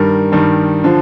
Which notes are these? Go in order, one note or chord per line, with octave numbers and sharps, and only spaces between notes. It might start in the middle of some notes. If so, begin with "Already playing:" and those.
Already playing: G2 D#3 G3 A#4
G2 D#3 G3
D3 F3